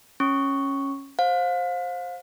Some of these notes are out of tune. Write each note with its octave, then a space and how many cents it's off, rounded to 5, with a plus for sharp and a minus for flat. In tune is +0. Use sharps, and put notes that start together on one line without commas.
C#4 -10 C#6 +0
C5 +10 F5 +30